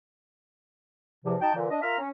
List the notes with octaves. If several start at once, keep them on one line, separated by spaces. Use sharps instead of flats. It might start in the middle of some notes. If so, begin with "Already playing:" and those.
E2 C3 F3
D#4 F#4 G5 A5
A#2 D3 E3
D4 D#5
F4 A#4 E5 F5 A#5 F6
C#4